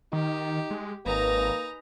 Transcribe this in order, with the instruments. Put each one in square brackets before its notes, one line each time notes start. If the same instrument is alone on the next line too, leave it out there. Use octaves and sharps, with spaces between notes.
[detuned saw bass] D#3 [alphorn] D#4 [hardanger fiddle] G4
[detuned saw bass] G#3
[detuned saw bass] G#1 [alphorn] A#3 [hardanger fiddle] D#4 A#5 [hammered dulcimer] B4 G#5